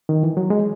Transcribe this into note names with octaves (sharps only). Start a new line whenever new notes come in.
D#3
E3
F#3
G#3